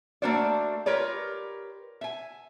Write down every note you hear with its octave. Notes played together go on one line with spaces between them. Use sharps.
A3 A#3 D4 F#4 C5 D5
F4 G4 A#4 B4 C#5 D5
E5 G#5